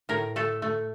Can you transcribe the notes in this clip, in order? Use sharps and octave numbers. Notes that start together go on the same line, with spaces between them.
A2 A#4
A3 A4
A3